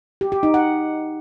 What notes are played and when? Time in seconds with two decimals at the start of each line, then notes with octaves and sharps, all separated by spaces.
0.21 G4
0.32 G4
0.43 D#4
0.54 F#5